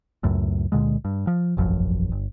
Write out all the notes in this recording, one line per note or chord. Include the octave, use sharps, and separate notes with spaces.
C#2 F#2 A2
C#2 A#2 D3 G#3
G2
F3
E1 A1 F#2 F3
G1